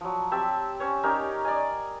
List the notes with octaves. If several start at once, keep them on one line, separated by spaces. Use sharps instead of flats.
F3 F#3
C4 G4 E5 A5
C#4 C5 C#5
C#4 D#4 G4 A#4
D5 D#5 G#5